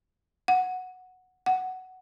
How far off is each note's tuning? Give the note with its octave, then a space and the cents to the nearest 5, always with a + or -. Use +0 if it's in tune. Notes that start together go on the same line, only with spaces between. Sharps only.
F#5 -5
F#5 +10